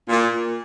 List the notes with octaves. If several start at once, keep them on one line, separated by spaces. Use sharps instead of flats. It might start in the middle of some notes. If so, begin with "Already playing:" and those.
A#2